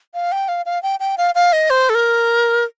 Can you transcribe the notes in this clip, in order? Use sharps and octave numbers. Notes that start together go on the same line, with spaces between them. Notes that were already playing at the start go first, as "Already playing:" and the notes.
F5
G5
F5
F5
G5
G5
F5
F5
D#5
C5
A4
A#4